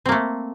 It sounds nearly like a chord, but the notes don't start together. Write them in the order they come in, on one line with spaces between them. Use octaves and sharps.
C4 A#3 A3